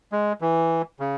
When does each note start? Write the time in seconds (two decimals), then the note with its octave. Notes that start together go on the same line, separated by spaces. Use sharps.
0.12 G#3
0.41 E3
1.00 C#3